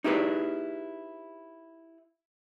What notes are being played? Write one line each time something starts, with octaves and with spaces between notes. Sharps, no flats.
D#4 E4 G4 G#4 B4